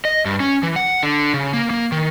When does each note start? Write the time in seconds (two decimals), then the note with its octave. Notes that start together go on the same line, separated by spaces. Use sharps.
0.05 D#5
0.25 G2
0.40 C#4
0.63 E3
0.76 F#5
1.03 D3
1.34 C#3
1.53 A#3
1.71 A#3
1.92 D#3